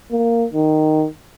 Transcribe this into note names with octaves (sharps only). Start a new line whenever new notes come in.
A#3
D#3